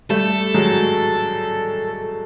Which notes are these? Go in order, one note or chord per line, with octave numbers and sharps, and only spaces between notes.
G3 A3 A4
F#3 G#3